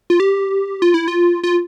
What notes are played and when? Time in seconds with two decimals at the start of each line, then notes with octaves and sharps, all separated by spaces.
0.10 F4
0.20 G4
0.82 F4
0.94 E4
1.08 F4
1.44 F4